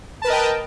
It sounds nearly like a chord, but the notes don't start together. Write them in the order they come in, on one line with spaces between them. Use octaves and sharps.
A5 B4 A#4 D#5 G5